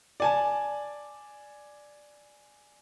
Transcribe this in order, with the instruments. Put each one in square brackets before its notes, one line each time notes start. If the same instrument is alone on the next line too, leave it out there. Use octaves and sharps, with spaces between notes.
[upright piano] D5 G#5 A5